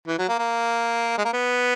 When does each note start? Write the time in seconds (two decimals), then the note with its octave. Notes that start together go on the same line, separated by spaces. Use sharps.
0.07 E3
0.18 F#3
0.29 A#3
0.39 A#3
1.18 G#3
1.25 A#3
1.33 B3